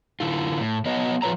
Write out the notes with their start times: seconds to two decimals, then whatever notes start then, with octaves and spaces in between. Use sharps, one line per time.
0.20 D3 E4 F4
0.60 A2
0.85 F#3 B3 C#5 D#5
1.22 F3 F4 B4 C#5 A#5